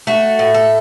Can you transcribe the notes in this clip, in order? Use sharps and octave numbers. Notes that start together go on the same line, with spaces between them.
A3 F#4
A2
A4